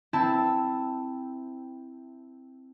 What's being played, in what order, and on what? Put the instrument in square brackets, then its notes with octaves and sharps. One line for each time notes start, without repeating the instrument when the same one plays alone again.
[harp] C4 E4 A5